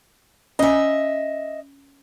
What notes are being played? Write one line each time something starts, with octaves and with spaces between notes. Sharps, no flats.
C#4 D#5 E5 G#5